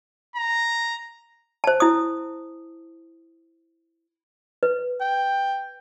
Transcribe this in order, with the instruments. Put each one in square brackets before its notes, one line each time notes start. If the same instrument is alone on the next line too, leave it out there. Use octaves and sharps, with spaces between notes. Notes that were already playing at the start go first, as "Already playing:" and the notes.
[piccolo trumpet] A#5
[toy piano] C5 A5
E4 D#6
B4
[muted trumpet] G5